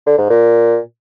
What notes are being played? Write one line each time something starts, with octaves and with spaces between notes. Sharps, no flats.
D3
G#2
A#2